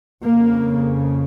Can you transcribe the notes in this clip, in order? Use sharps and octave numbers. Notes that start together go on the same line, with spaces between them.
F2 C#3 A#3